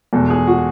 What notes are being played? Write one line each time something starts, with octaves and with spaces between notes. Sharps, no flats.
E2 B2 G#3 A4
G#4
F#4